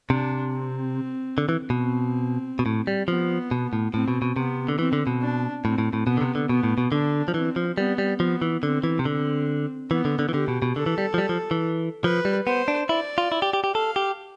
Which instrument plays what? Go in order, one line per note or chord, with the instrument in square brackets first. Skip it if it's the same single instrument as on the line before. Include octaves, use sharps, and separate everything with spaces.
[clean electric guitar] C3 [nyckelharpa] D4
[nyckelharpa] C4
[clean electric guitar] D3
E3
B2
[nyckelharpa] C4
[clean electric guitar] B2
A2
G3
[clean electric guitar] F3 [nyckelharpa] B3
[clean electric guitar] B2
A2
[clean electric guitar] A2 [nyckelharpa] C4
[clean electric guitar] B2
B2
[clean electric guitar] C3 [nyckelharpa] B3
[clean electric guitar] D3
[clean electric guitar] E3 [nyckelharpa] C4
[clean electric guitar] D3
B2
[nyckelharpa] D4
[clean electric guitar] A2 [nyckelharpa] C4
[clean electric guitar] A2
A2
[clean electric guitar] B2 [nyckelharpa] B3
[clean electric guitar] D3
C3
D3
[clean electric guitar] B2 [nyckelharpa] B3
[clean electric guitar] A2
B2
[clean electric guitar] D3 [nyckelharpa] D4
[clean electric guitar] F3
[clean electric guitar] E3 [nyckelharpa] C4
[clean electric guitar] F3
[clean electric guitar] G3 [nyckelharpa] B3
[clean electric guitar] G3
[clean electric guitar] F3 [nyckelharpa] B3
[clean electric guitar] E3
[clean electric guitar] D3 [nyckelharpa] C4
[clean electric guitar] E3
C3
[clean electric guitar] D3 [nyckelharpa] C4
[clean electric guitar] E3 [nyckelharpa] B3
[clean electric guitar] D3
D3
E3
[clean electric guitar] D3 [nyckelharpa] G4
[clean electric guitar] B2
B2
[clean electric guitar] D3 [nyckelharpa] A4
[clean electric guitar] E3
G3
F3
G3
F3
E3
[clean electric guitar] F3 [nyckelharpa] B4
[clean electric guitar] G3
[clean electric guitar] B3 [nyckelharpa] C5
[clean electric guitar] D4
[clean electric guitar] E4 [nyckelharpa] D5
[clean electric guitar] F4
E4
G4
G4
G4
[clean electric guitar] A4 [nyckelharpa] F5
[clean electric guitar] G4